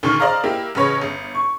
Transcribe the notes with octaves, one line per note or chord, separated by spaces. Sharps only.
D2 A#2 D#3 C#6 F6
C5 D5 D#5 F5 A#5
A#3 E4 G4
A1 C#3 B4 C#5
G1
C#6